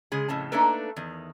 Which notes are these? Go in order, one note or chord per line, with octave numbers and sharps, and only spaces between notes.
C#3 G#3 G#4
F2 A2 C#3 A5
A3 A#3 D4 D#4 A4 B4
E2 D#3